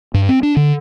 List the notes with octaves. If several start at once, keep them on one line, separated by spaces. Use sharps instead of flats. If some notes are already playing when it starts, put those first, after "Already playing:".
G2
C4
D4
D3